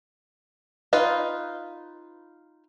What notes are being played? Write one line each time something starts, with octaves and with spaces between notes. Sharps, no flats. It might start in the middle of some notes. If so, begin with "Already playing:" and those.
D#4 F4 B4